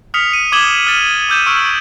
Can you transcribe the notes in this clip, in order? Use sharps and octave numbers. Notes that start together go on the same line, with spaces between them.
D#6 F6 B6 C#7 F7
C#7 D#7
D6 D#6 G#6 E7 F#7 G7
F6 A6 D#7
D6 E6 G6 A6 E7
C#6 E6 F6 D7 D#7